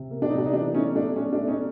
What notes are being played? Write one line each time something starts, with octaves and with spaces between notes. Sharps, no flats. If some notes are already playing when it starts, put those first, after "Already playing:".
Already playing: C3
A#3
D4
C3 D#4
D4
D#4
E3 D4
A3 C#4 D#4
A3 D4
A3 C#4
D4
A3
C#4 D#4